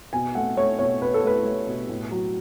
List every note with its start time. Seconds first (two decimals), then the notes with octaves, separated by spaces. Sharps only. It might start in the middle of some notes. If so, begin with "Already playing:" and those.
0.13 B2 G#5
0.35 A3 F#5
0.57 A3 C#5
0.79 B2 C#5
1.01 B2 B4
1.14 A4
1.24 A3 B4
1.45 A3
1.67 B2
1.89 A2
2.11 F#3